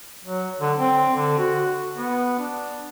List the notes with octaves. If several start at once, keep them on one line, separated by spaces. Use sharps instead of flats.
F#3
D3
C4
D3
F#4
B3
D4